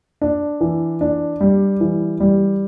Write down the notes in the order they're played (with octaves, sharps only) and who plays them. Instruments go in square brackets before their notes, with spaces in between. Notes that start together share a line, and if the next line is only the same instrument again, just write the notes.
[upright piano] D4
E3
D4
G3
E3
G3